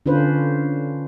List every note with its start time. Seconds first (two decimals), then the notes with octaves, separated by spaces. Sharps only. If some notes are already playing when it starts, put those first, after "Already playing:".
0.06 D3 C#4 D4 F4 B4 C5